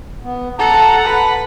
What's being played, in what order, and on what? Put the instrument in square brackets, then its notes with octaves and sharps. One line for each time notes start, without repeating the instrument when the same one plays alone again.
[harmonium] B3
[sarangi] A4 [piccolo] F#5 [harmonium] A5 A#5
[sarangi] B4